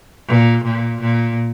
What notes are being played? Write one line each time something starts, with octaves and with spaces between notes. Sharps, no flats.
A#2
A#2
A#2